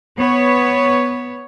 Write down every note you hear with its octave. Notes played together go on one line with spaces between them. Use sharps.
B3 C#5